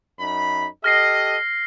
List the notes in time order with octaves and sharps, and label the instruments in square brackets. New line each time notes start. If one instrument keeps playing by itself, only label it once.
[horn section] F#2 D#4 B5
[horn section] G4 A4 D#5 [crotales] F6 A#6 C7